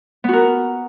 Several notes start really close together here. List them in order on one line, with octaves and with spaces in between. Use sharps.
B3 F#4 A#4